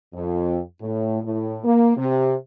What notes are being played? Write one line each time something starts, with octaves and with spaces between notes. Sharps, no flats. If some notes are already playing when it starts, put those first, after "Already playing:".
F2
A2
A2
A#3
C3